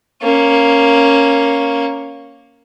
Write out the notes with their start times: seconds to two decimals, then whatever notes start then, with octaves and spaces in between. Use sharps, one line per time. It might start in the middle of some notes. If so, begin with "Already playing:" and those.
0.23 A#3 C#4